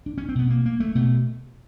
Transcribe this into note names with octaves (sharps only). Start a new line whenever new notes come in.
D4
C#4
C4
B2 B3
A#3
A#3
A3
B2 A3